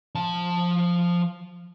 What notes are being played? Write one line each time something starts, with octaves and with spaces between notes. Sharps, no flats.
F3 A5